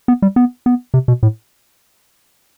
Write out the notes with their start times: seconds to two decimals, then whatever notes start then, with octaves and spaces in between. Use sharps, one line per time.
0.08 B3
0.22 G3
0.36 B3
0.66 B3
0.94 C3
1.08 B2
1.23 A2